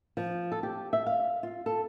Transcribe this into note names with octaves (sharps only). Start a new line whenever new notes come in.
F3
A4
G4
E5
F5
F4
A4